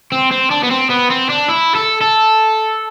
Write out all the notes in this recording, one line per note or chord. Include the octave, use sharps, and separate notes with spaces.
C4
C4
D4
B3
C4
B3
C4
D4
E4
A4
A4